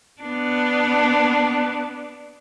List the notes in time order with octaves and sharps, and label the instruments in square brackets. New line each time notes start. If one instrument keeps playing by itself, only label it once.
[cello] B3 D4